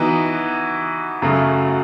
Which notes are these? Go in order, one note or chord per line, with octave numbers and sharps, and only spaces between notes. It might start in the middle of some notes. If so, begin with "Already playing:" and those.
Already playing: E3 B3 D#4 F#4
F#2 C#3 F#3 A3